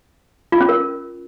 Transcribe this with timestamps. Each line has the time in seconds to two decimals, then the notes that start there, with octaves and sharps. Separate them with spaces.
0.52 F4
0.61 C#4
0.69 A#4